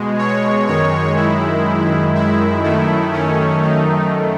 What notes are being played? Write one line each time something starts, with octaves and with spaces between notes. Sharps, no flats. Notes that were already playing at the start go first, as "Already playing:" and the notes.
Already playing: B2 G#3
C#5
F#2 D#3 G#3 C#5
E4
E4
F#2 D#3 A3 E4
C#4
D#4